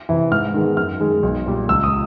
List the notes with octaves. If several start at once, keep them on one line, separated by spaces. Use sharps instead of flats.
C3 E3
G#2 F6
D#3 G#3 B3
F#2 F6
D#3 G#3
B1
A#2 G3
C#2 E6
D#6